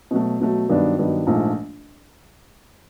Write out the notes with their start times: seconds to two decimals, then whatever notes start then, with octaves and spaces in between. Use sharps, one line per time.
0.11 B2 F#3 A3
0.40 B2 F#3 A3
0.69 G2 D#3 F#3 B3 D4
0.98 G2 D#3 F#3 B3 D4
1.27 A#1 G#2 F3 A3